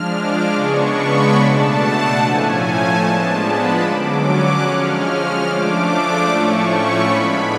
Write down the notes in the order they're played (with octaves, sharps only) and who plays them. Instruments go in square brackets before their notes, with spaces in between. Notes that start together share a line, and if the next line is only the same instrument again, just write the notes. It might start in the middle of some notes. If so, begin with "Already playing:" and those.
Already playing: [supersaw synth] F3 G#3 D4 F6
D6
C#3 G#3 B3 D4 C#6
B5
B2 A3 D4 A5
F#5
A2 F3 A3 C#4 G#5
A5
F3 G#3 B3 D4
B5
D3 F#3 C#4 D6
F#6
F3 G#3 C#4 F6
F6
F3 A3 D4 D6
A2 F3 A3 C#4 C#6
B5
A2 G#3 B3 D4